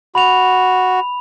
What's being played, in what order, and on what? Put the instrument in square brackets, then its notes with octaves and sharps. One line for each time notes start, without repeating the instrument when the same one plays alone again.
[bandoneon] F#4 [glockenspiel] B5 F7